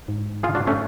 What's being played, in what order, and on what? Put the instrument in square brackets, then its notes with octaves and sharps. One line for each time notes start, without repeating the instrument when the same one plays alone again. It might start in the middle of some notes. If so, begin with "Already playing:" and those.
[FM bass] G#2
[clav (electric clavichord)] F4 G#4
D4 F#4
A3 C#4